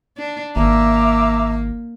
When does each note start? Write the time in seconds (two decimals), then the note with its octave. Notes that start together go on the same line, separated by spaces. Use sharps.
0.18 D4
0.56 G#1 A#3 E5 A#5 D6